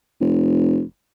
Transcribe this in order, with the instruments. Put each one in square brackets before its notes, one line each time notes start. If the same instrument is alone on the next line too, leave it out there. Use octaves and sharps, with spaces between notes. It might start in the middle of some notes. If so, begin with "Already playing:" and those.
[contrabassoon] F1